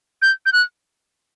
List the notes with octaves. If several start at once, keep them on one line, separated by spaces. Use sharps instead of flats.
G6
G6
F#6